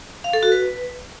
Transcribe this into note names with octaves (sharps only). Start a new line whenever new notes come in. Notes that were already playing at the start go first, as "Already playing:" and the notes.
F5
A4
F#4
B4